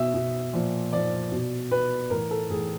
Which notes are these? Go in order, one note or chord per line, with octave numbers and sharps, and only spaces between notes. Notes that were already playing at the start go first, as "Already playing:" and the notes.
Already playing: B2 E5
B2
A#2 F3
A#2 F3 D5
B2
B2 B4
A2 E3 A#4
A4
A2 E3 G#4